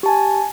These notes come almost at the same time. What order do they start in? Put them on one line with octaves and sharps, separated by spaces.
G4 A5 G#5